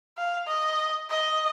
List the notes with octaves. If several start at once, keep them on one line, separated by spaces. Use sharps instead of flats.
F5
D#5
D#5